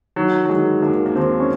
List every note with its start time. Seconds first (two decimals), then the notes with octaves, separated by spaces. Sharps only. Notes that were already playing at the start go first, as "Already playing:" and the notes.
0.16 D#3 F#3
0.45 F#3
0.49 D#3 G#3
0.82 D#2 A#3
1.06 A#3
1.15 D#2 C4
1.40 C#4